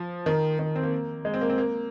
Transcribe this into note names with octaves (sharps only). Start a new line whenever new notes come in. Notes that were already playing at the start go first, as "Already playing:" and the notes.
Already playing: F3
D#3
D#3
C4
A#3
G#3
C4
A#3
C4
A#3